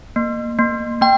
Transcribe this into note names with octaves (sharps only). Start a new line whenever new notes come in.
A#3
A#3
A#3 G5